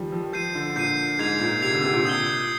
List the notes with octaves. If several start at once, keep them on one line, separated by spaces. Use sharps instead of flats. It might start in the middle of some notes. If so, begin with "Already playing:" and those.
Already playing: D#3 F3 G3
F3
F3 G6 C7 D#7
D3
A#2 G6 C7 D#7
G#2 G#6 C7 F7
A#2
C3 G#6 C7 F7
D3
C3
A#2
D#6 G6 C7 G7